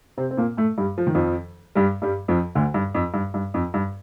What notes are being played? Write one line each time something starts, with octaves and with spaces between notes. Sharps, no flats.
C3 C4
C4
A#2 A#3
A2 A3
G2 G3
F3
D#3
F2 F3
G2 G3
G2 G3
F2 F3
D2 D3
G2
F2
G2
G2
F2
G2